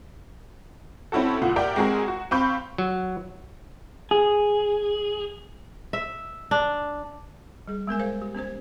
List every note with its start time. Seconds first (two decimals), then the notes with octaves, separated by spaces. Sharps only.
1.12 C4 C#4 E4 F#4 A4
1.42 C#2 A#2 F#5
1.56 G4 A#4 D5 E5 F#5 G5
1.76 G#3 C4 F#4 G#4 A#4
2.08 F#4
2.31 C4 F5 B5 C#6 G6
2.78 F#3
4.11 G#4
5.93 E5
6.51 D4
7.68 G3 G#4
7.87 G#3 B3 A#4 G#5
8.00 G#4 A#4 C5 F5
8.22 G4
8.35 B3 C#4 G4 C5